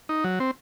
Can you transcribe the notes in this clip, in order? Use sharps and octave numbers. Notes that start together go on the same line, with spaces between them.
D#4
F#3
C4